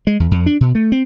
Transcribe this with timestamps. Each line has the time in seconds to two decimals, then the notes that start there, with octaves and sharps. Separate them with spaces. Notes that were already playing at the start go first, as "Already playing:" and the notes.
0.07 G#3
0.20 E2
0.31 F2
0.46 D4
0.61 B2
0.75 A3
0.92 C4